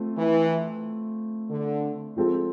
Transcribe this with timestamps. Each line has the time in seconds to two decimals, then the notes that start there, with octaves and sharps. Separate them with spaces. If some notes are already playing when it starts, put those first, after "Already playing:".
Already playing: A3 C4 F4
0.18 E3
1.50 D3
2.16 F3 G#3 C4 F4 A4